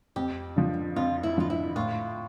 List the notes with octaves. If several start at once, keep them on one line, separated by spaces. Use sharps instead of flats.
F2 G4
D3 F3
F2 F4
E4
D3 F3 F4
E4
A2 F4